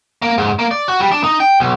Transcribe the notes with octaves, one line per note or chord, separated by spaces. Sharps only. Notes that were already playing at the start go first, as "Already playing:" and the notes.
A#3
G#2
A#3
D5
F#4
G3
D4
D#4
G5
B1